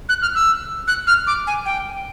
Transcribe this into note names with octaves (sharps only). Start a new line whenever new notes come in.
F#6
F6
E6
F#6
F6
D6
G#5
G5